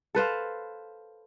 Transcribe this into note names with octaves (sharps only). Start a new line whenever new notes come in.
A4 B4 C5 F5